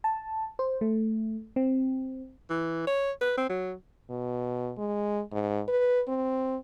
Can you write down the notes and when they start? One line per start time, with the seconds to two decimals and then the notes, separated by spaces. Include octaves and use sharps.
0.04 A5
0.59 C5
0.81 A3
1.56 C4
2.50 E3
2.87 C#5
3.21 B4
3.38 C4
3.49 F#3
4.10 B2
4.78 G#3
5.32 G#2
5.68 B4
6.08 C4